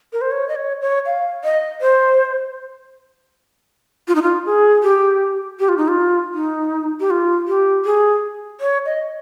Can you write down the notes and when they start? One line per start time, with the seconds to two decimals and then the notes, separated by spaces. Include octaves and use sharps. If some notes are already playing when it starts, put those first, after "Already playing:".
0.13 A#4
0.21 C5
0.31 C#5
0.49 D#5
0.56 C#5
0.81 C#5
1.06 F5
1.44 D#5
1.81 C5
4.08 F4
4.15 D#4
4.22 F4
4.46 G#4
4.83 G4
5.59 G4
5.69 F4
5.77 D#4
5.88 F4
6.34 D#4
7.00 G4
7.10 F4
7.48 G4
7.85 G#4
8.61 C#5
8.86 D#5